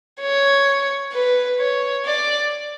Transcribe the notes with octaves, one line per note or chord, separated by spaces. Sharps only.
C#5
B4
C#5
D5